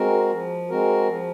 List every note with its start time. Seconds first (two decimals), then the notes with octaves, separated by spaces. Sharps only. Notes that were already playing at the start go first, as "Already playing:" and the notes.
Already playing: G#3 C4 F#4 A#4
0.31 F3
0.69 G#3 C4 F#4 A#4
1.07 F3